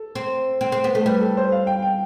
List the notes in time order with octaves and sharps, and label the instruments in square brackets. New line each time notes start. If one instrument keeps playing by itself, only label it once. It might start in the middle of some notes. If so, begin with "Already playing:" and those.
Already playing: [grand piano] A4
[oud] C4
C4
C4
B3
A3
[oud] G3 [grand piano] B4
[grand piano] A4
C5
F5
G5
G5